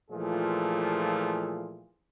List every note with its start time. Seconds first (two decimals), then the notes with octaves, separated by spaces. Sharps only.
0.11 A#2 E3 F3 A3 F4 G#4